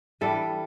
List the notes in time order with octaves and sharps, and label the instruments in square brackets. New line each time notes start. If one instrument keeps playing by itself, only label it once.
[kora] E3 G3 D4 A4